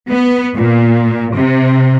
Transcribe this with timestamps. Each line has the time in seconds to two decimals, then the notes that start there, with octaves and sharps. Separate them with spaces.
0.10 B3
0.56 A#2
1.36 C3